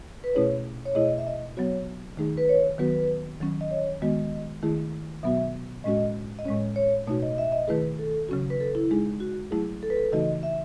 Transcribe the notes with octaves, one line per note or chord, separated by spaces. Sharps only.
B4
B2 A3 C#4 E4 G#4 C#5
C#5
B2 A3 E4 G#4 D#5
E5
D#5
F#3 B3 F#4 C#5
D#3 A3 D#4 G#4
B4
C#5
D#3 F#3 B3 F#4 B4
D#3 F#3 C#4
D#5
C#5
D#3 G#3 B3 F#4 D#5
D#3 A3 E4 G#4
B2 F#3 B3 F#4 E5
A2 G#3 C#4 F#4 D#5
D#5
A2 G#3 C#4 C#5
C#5
B2 A3 D#4 F#4 C#5
D#5
E5
D#5
D#3 A3 E4 G#4 B4
A4
C#3 F#3 C#4 F#4
B4
A4
E4
G#3 D#4 G#4
F#4
F#3 A3 E4 G#4
A4
B4
A4
C#3 E3 A3 D#4 F#4 D#5
E5